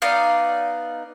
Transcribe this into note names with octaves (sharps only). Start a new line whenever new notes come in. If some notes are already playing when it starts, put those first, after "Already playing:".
B3 D#4 D5 F5